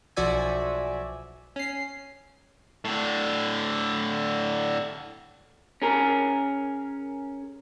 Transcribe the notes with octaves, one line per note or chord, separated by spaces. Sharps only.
B1 F3 F#4 D5 E5 G#5
C#4 C7
A2 D3
C#4 G#4 A#4